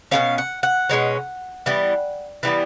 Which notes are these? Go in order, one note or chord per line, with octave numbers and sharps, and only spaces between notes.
B2 G#3 C#4 F5
F#5
F#5
B2 G#3 C#4
E3 G3 B3
E3 G3 B3